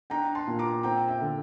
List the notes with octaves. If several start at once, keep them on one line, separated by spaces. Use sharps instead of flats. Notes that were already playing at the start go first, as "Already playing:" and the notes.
D4 G5 A#5
A5 C6
A#2
A#5 D6
C4 G5 A#5
E5 G5
D3